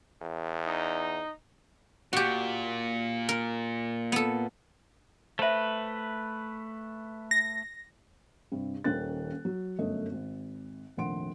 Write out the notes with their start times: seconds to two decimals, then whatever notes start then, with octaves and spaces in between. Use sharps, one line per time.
0.21 E2
0.67 D#4
2.13 A#2 F#4 G4
3.29 A#4
4.12 B3 A4
5.39 A3 B4 C5 E5
7.31 A#6
8.52 G2 C3
8.84 D#1 D#3 C#4 F#6 A6
9.45 F#3
9.79 G1 F#2 A3 D#5
10.12 G#1
10.97 F1 A#1 D#3 F#5 C6 D7